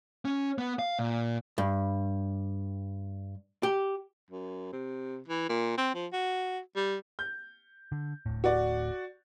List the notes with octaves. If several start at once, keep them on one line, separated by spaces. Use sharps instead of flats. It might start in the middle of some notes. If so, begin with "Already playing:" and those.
C#4
B3
F5
A#2
G2
G4
F#2
C3
E3
A#2
C4
F3
F#4
G3
G6
D3
D1 A2
F#4 D5